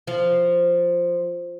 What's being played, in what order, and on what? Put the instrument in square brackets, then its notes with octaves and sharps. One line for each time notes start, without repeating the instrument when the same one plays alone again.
[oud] F3